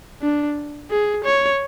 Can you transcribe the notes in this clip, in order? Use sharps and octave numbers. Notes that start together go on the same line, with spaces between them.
D4
G#4
C#5